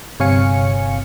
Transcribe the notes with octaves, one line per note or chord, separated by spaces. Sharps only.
G1 C3 C#5 F5 G#5 C#7